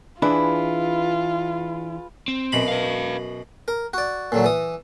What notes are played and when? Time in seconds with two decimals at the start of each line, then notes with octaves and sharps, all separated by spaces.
0.22 E3 D4 E4 F4 G#4 B4
2.28 C4
2.52 F#2 B2 B5
2.68 B4 F5
3.68 A#4
3.93 F#4 D5
4.32 A#2 D3 F#3
4.44 E3 D#6